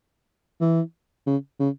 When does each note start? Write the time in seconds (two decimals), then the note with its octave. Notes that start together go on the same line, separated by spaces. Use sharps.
0.61 E3
1.26 C#3
1.59 C#3